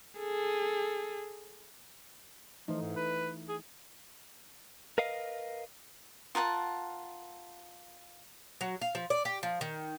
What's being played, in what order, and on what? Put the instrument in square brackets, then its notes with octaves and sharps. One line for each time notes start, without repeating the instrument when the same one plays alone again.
[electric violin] G#4 A4
[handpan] E3 A3 D#4 [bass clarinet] F3
[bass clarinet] G#2
B4
G#4
[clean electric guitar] A#4 B4 D#5 F5
[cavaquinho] F4 A#4 F#5 A5
[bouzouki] F#3
F5
F3
D5
G4
F3
D#3